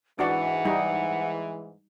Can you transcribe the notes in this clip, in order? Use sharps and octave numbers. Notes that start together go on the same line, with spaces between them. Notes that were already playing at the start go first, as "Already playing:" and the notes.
G#2 E3 D4 F#4 D5 F#5
G3 D#4